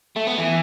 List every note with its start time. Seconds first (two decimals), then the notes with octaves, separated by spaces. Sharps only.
0.16 A3
0.28 B3
0.39 E3